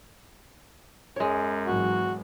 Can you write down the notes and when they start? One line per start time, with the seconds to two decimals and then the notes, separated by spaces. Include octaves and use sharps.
1.16 F#2 G#3 C#5
1.66 G#1 E3 F#3 F#4